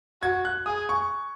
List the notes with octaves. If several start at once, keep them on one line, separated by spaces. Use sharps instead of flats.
F#4 G#6
F#6
G#4 D#6
C#6